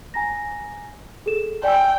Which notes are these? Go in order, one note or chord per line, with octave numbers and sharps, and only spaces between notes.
G#5 A#5 A#6
G#4 A4 E7
D5 G5 G#5 E6